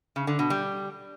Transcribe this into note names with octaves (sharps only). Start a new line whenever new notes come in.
C#3
D3
B2
G3